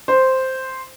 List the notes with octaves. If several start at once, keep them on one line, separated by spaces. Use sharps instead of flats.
C5